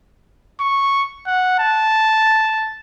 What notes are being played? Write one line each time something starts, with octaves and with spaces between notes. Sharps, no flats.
C#6
F#5
A5